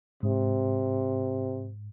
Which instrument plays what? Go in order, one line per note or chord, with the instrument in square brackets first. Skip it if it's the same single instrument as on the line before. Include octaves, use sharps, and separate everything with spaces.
[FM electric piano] G#2 [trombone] C3